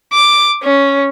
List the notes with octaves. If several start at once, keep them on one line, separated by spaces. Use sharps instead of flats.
D6
C#4